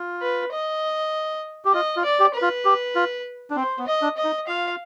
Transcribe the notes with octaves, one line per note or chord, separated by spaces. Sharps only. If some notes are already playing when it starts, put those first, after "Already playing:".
Already playing: F4
B4
D#5
G4
F4 D#5
F4
D5
G4
B4
F4
G4
F4
D4
C4 C5
B3
D#5
D4
D#5
D#4
F4 F5